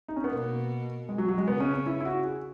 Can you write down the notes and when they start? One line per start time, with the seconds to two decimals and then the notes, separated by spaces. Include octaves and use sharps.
0.08 D#4
0.16 C#4
0.24 B3
0.31 B2 A#3
1.09 G#3
1.18 F#3
1.28 F#3
1.38 G#3
1.47 C#3 B3
1.60 C#4
1.73 C#4
1.86 E4
2.00 E4
2.05 F#4
2.24 G#4